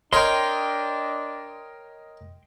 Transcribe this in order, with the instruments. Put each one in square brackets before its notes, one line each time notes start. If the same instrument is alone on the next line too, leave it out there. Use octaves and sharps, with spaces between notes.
[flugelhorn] D4 [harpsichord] A#4 C#5 F5 [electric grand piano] D#5 [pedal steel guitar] G5 C6